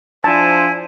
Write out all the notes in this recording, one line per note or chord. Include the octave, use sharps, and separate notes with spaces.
F3 D4 E4 C5 G#5 A5